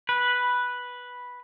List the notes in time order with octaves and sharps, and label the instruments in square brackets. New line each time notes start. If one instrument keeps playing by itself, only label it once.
[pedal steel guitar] B4